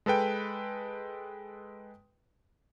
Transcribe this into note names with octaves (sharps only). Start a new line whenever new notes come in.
G#3 A4 B4 G5